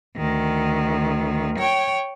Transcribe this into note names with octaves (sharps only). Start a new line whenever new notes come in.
D2 D#3
C#5 G5